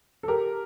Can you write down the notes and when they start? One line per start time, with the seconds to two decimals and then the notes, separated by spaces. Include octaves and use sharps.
0.23 A4
0.28 G4 A#4